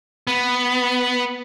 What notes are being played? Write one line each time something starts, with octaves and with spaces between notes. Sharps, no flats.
B3